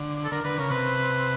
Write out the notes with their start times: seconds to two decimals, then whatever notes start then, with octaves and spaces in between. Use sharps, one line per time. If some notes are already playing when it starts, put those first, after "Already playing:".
Already playing: D3
0.24 A4
0.32 D3 A#4
0.44 D3 B4
0.58 C#3 A#4
0.70 C3 B4